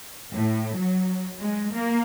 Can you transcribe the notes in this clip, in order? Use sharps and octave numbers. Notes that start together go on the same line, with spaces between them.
A2
F#3
G#3
A#3